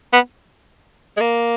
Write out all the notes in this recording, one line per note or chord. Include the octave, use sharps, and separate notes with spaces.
B3
G#3
A#3